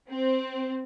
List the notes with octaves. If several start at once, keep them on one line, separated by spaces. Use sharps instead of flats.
C4